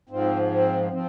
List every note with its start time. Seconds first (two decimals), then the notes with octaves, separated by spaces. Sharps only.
0.09 G#2 F3 C4
0.51 C4
0.92 F3 C4